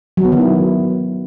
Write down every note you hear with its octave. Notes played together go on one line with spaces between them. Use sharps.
F#3
B3
D#3
E4